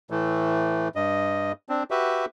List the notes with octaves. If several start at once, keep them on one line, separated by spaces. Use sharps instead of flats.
A2 E3 A3
G2 D#5
C4 D4
F#4 G4 B4 E5